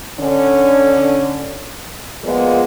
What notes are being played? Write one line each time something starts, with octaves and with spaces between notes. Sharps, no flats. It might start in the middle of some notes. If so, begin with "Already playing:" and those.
D3 C#4
A#2 F3 G#3 B3